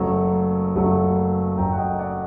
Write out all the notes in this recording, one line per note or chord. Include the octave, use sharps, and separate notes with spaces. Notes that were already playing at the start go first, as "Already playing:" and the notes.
Already playing: F#1 F#2 F#3 A3
F#1 F#2 F#3 A3
F#1 F#2 F#3 A3 G5 A#5
F#5
D#5 G5
D5 F#5